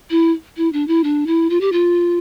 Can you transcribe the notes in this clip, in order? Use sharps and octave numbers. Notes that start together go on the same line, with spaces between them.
E4
E4
D4
E4
D4
E4
F4
G4
F4